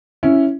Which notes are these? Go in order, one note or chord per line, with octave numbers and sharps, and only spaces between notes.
C#4 E4